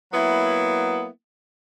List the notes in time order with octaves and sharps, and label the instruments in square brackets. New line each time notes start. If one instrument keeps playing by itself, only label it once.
[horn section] F#3 A#3 B3 E4